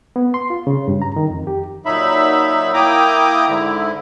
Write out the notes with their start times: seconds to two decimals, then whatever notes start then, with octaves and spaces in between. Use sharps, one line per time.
0.16 B3
0.34 C6
0.50 F4
0.67 C#3
0.88 G2
1.02 A#5
1.16 D#3
1.30 F2
1.47 G4
1.86 A#2 F#3 D#4 E5 B5
2.74 A#3 E4 G5 A#5 D6 D#6
3.48 G#2 D3 E4